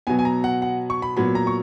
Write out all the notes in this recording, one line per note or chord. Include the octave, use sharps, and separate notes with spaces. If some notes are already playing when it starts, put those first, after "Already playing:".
B2 F#3 B3 G#5
G#5
A#5
F#5
F#5
C#6
B5
A#2 F#3 B3 B5
A#5
C#6